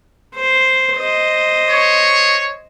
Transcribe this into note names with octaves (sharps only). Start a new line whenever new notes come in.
C5
C5 D#5
C#5